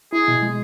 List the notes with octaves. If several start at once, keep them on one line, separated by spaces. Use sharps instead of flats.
E4 G#4
B2
G#3